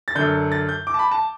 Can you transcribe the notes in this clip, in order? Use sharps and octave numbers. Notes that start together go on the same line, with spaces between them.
A6
F#2 D3 G6
A6
G6
D6
A5
B5
A5